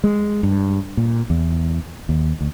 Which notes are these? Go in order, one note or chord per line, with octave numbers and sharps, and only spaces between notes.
G#3
G2
A#2
E2
D#2
D2